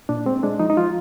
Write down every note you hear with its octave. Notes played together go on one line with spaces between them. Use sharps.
A#2 D4
G#3 C4
G#3 D4
F3 D#4
D#4
F3 F4